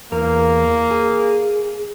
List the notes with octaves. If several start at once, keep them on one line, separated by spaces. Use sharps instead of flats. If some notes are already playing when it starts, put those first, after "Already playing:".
E2 A#3 A#4
G#4